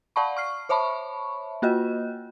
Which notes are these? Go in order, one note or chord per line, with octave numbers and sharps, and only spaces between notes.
D5 F5 F#5 A5 B5 C#6
C#6 F6 C7
C5 C#5 E5 A5 B5 C#6
A#3 F4 F#4 D#5